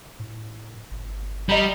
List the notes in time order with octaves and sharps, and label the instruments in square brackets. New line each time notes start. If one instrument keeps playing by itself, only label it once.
[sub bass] A2
G1
[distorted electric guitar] G3 [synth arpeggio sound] D#5 A#5 B5